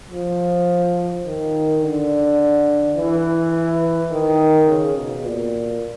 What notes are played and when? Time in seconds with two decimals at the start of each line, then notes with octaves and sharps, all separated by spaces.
0.11 F3
1.25 D#3
1.82 D3
2.96 E3
4.11 D#3
4.68 C#3
4.97 B2
5.25 A#2